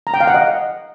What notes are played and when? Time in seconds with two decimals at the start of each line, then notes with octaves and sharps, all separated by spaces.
0.07 A#5
0.14 G5
0.21 F5
0.27 F#5
0.34 D#5